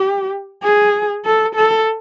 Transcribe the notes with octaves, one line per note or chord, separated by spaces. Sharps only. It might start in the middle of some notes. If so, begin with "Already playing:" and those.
Already playing: G4
G#4
A4
A4